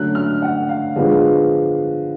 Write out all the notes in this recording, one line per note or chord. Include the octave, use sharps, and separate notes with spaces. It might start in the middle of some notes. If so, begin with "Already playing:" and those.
Already playing: D3 F#3 A3 C#4 F#6
F6
F#5
F5
D3 F3 G#3 B3 D4